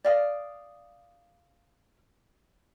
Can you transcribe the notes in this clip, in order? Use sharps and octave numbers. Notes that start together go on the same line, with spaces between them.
D5 F5 D#6